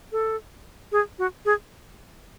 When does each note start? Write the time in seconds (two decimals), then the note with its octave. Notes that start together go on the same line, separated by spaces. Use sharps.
0.12 A4
0.92 G#4
1.19 F#4
1.45 G#4